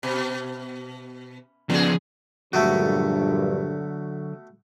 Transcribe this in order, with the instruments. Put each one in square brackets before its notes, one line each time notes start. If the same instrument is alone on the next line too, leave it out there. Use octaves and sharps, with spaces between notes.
[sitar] B2
[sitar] C#3 G#4 [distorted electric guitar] F3 B3
[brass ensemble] A#1 G2 [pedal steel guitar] D3 F#3 [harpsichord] A3 B3 F#4